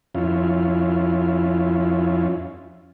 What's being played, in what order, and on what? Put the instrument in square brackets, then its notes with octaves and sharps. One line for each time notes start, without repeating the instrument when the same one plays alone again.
[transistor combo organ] F2 C#4 E4 F4